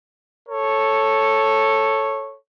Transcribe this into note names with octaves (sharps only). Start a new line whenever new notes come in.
A4 C#5